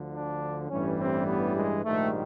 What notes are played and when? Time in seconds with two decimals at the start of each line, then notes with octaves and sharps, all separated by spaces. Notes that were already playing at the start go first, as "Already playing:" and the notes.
Already playing: D2 D3 F3
0.10 D4
0.68 A1 G2 E3 G3 C#4
0.98 C4
1.27 B3
1.55 G#3
1.84 A#1 G#2 D#3 G3 A3